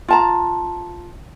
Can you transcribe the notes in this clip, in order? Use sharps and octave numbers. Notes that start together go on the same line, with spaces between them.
F4 A5 A#5